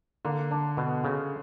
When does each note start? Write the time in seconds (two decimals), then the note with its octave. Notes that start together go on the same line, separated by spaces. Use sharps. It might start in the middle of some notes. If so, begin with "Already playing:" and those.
0.25 D3 A#3
0.51 D4
0.77 B2
1.04 C#3